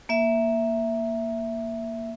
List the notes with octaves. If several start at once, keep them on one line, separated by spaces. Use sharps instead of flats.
A#3 E5